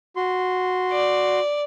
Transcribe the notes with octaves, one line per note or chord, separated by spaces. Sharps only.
F#4 C6
D5